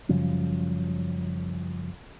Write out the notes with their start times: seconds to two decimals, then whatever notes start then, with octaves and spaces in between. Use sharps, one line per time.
0.09 F#2 C#3 F3 G3